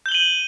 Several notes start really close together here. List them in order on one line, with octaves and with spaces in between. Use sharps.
G6 G7 F#7 D#7